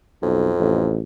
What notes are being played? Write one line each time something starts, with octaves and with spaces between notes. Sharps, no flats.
B1 F2
A1